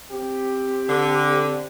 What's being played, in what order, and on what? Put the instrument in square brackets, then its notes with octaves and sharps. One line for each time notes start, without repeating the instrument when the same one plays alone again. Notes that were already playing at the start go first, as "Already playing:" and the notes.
[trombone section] C4 G4
[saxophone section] D3